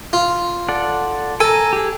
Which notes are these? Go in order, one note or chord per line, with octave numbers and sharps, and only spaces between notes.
F4
A4 D5 F#5
A4 G#5 A#5
G4 G#4